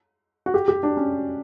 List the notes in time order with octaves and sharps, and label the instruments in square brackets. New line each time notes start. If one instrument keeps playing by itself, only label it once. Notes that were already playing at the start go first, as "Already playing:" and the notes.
[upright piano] F#4
G4
G4
D4
C#4